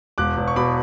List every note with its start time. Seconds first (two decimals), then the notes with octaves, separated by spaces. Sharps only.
0.18 E1 D6 F#6
0.37 E1
0.48 C#6
0.56 B2 B5 D6